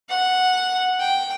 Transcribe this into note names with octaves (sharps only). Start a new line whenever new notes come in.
F#5
G5